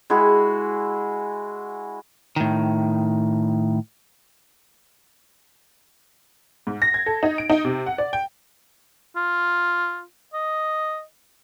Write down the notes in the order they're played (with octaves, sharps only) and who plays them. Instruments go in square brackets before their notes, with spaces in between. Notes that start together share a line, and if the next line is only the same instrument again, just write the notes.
[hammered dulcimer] G#3 E4 F#4 G#4
[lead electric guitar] A2 D#3
[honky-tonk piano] G#2
A#6
G#6
A4
D#4
D7
D#4
C3
F#5
D5
G5
[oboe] F4
D#5